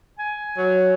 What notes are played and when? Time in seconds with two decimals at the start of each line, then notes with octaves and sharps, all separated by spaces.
0.19 G#5
0.57 F#3